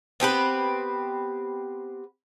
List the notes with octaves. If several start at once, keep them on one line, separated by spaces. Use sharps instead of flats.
B3 C4 G4 B4